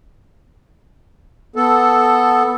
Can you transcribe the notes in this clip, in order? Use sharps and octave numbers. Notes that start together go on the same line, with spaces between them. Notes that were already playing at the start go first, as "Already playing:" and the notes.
B3 A4